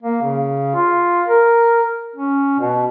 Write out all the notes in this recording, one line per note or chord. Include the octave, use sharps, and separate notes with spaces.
A#3
C#3
F4
A#4
C#4
B2